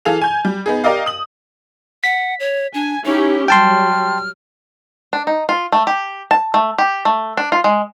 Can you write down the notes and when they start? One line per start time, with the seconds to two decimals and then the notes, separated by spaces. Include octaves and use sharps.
0.05 E3 G#4 A4 F5 F7
0.21 G#5 G6
0.45 G3
0.66 B3 D#4 G#4
0.84 G4 A#4 D5 D#5 F5
1.06 D#6 F#7
2.04 F#5 B6
2.40 C#5
2.74 D4 G#5
3.05 C#4 D#4 E4 G4
3.48 F#3 G3 G5 A5 C6 F6
5.13 D4
5.27 D#4
5.49 F4
5.72 A3
5.87 G4
6.31 A5
6.54 A3
6.78 G4
7.05 A3
7.37 D4
7.52 F4
7.64 G#3